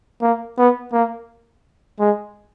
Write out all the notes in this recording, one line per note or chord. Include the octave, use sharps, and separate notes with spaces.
A#3
B3
A#3
G#3